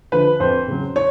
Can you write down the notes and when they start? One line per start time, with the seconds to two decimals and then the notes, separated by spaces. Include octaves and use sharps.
0.12 D3 F3 B4
0.40 F2 C5
0.68 C#3 F#3
0.96 C#5